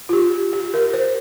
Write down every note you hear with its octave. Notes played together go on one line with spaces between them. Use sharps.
F4
G4
G4
A#4
C5